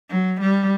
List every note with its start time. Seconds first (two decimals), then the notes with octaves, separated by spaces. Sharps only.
0.10 F#3
0.41 G3